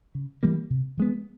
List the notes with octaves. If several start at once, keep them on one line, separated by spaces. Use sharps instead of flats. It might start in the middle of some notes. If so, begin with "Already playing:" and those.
C#3
E3 G3 A#3
C3
F3 G#3 B3